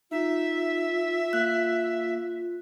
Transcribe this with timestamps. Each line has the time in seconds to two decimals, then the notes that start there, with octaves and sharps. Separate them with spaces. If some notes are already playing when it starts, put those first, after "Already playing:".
0.11 D#4 F4 E5
1.33 A#3 F#6